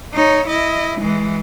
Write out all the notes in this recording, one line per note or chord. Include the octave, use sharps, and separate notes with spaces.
D#4 C#5
E4 D#5
E3 G#3